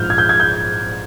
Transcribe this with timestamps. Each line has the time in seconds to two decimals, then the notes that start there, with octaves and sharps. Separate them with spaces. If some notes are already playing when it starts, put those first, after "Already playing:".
Already playing: A#1 G#2 F3 F6 G6
0.10 G#6
0.18 G6
0.29 G#6
0.40 G6